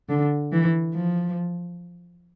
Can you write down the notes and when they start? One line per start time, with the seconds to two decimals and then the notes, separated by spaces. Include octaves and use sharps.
0.09 D3
0.52 E3
0.94 F3